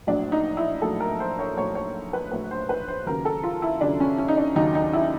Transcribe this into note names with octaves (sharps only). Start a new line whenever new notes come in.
A#1 A2 F#3 D4
D#4
E4
A#1 A2 F#3 A4
A#4
C5
C#5
A#1 A2 F#3 C#5
C#5
B4
A#1 A2 F#3 B4
C5
B4
C5
D#2 C#3 F#3 A#4
A4
F4
E4
D#2 C#3 F#3 D4
C#4
C#4
D#4
D4
D#2 C#3 F#3 D#4
D#4
E4